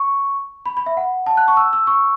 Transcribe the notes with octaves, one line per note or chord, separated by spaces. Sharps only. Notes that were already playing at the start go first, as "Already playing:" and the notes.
Already playing: C#6
B5
B5
E5
F#5
A5
F#6
C#6
E6
E6
C#6